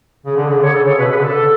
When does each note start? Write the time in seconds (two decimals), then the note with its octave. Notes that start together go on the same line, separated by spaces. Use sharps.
0.26 C#3
0.37 D3
0.49 C#3
0.61 D3 C#5
0.73 C#3 A4
0.86 C#5
0.98 B2 B4
1.08 C#3 B4
1.17 D3
1.23 A4